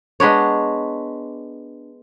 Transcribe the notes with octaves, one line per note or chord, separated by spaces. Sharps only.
G#3 B3 D4 C#5